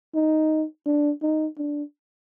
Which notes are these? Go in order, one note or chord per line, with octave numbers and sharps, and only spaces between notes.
D#4
D4
D#4
D4